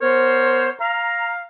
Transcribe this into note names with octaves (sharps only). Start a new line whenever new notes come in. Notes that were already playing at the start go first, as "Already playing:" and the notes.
B3 A#4 C5 C#5
F5 A#5